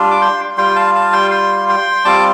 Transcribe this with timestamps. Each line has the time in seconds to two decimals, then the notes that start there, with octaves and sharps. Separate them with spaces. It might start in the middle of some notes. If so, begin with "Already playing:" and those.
Already playing: G3 D4 F4
0.11 D6
0.21 G5 C6
0.57 G3 F4 G5 C6
0.76 F5 A5
0.95 F5 A5
1.13 G5 C6
1.31 G5 C6
1.69 G5 C6
2.05 G3 C4 F4 A5 D6